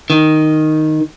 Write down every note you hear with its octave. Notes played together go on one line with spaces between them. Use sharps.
D#3